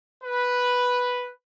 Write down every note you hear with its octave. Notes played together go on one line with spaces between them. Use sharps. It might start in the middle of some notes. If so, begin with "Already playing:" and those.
B4